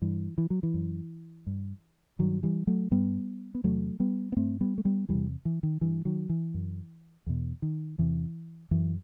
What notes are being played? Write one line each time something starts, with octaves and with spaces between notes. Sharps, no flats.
G2 E3
E3
F#3
E3
F#2
G2
G2 D#3 F#3
E3 G3
F#3 A3
G2 G3 B3
B3
E2 C3 F#3 A3
G3 B3
B3
G2 A3 C4
G3 B3
A3
G3 B3
E2 C3 E3 G3
E3
D#3
G2 E3
D#3 F#3
E3
F#2
E2 B2
D#3
E2 C3 E3
F#2 E3